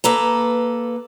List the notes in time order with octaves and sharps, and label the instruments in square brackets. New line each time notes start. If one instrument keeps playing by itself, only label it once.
[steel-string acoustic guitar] A#3 A4 B4 A#5